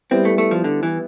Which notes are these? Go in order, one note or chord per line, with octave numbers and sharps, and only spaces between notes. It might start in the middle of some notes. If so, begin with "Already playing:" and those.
G3 B3 C4 E4
A3
A3
F3
D3
E3